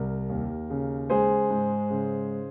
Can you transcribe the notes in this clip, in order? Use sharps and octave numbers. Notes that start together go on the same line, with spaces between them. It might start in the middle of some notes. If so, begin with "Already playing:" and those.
Already playing: C2 A#4
D#2
C#3
G#3 G#4 C5
G#2
C#3